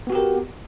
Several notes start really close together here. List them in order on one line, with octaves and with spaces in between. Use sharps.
B3 F#4 G4 A#4